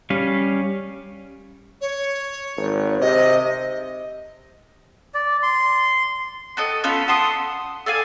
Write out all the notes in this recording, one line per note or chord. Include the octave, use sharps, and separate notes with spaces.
G3 C#4 F5
C#5
G#1
C3 D#5
D5
C6
F#4 A4 D#5
B3 C#4 F4 A4
F#5 A5 C6 D#6
A4 D5 F5 G#5